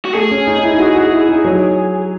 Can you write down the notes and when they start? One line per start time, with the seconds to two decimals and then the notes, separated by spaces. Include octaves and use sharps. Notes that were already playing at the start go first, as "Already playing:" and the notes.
0.05 F#4
0.14 A3 G#4
0.31 C#4
0.47 D#4
0.58 D#4
0.63 E4
0.74 E4
0.80 F#4
0.96 F#4
1.12 E4
1.29 D#4
1.45 F#3